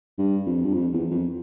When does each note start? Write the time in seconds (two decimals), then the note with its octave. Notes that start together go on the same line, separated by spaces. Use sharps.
0.18 G2
0.46 F2
0.64 G2
0.74 F2
0.93 E2
1.11 F2